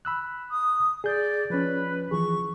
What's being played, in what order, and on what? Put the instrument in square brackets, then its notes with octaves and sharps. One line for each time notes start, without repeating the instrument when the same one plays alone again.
[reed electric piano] B5 E6 F#6
[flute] D#6
[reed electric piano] G#4 G6 [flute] D5
[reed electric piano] F3 C#4 [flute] B4
[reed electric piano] E3 F3 G#4 [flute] C#6